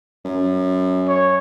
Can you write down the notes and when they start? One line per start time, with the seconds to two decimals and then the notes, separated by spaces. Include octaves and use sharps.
0.25 F#2
1.08 C#5